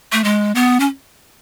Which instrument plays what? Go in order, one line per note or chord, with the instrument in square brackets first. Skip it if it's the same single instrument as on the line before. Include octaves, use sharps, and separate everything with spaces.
[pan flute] A3
G#3
B3
C#4